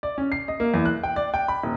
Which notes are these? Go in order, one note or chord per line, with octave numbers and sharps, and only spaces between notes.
D5
C#4
C7
D#5
A#3
E2
F#6
G5
D5
G5
B5
D#1